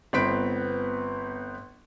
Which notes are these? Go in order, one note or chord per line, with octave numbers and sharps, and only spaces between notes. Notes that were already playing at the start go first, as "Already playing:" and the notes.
G1 B3 C4 B4 B6 D7